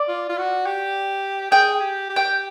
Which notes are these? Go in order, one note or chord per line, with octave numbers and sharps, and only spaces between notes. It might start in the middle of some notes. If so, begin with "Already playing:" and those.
Already playing: D5
F4
F4
F#4
G4
G#4 G5
G4
G4
G5